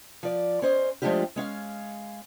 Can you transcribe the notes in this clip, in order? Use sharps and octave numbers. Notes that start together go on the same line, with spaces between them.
F3 D5
C#4 C5 D#5
F3 G#3 A3 D4 F4 G4
G#3 C#4 F5